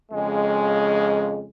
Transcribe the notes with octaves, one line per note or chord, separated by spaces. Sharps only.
F2 C#3 G#3